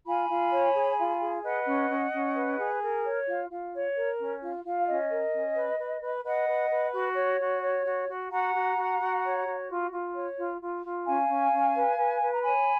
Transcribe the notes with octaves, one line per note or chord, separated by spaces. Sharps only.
F4 G#5 B5
F4
C#5
G#4
F4
G#4
B4 D#5 F#5
C#4
C#4
C#4
B4
G#4
A#4
C#5
F4
F4
C#5
A#4
C#4
F4
F4
F5
C#4 D#5
A#4
C#4
B4
B4
B4
B4 D#5 F#5
B4
B4
F#4
C#5
F#4
C#5
F#4
F#4
F#4 F#5 A#5
F#4
F#4
F#4
C#5
F#4
F4
F4
C#5
F4
F4
F4
C#4 F5 G#5
C#4
C#4
B4
B4
B4
A#5
C#5 G#5 B5